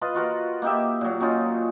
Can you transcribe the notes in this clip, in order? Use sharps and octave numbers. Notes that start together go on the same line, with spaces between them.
F4 B4 D#5
F4 F#4 A#4 B4
A#3 D#4 G4 E5
A#2 F#3
F#3 C#4 D#4 F4